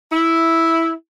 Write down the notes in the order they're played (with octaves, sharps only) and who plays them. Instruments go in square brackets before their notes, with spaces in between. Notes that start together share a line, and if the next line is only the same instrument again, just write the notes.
[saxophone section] E4